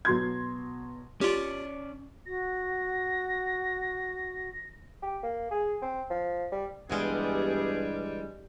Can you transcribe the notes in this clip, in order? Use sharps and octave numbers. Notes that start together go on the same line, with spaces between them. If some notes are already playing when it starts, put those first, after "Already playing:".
B2 F#3 C6 G#6
C#4 F4 G4 D5
F#4 A#6
G4
A#3
G#4
C4
F3
G3
G2 D3 E3 G3 G#3 B3 G4 G#4